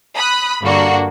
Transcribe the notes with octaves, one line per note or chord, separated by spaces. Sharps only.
B5 D#6 F#6
G2 D3 A#3 D4 F#4